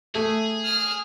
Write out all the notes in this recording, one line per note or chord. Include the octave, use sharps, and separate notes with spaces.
A3 G#4
F6